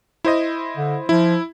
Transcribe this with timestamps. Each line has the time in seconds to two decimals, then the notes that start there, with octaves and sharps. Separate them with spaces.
0.25 E4 C5 D#5
0.77 D3
1.09 F3 E4